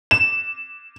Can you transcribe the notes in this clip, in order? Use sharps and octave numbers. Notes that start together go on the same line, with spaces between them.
E7